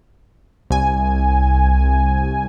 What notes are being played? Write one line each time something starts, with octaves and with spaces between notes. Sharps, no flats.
C2 G#5